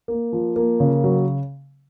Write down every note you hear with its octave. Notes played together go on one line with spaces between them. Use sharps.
A#3
F3
A#3
C#3
F#3